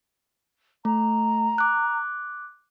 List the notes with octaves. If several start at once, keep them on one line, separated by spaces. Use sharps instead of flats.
A3 A#5
D6 F#6